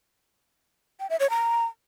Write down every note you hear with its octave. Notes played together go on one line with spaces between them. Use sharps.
G5
E5
C#5
A#5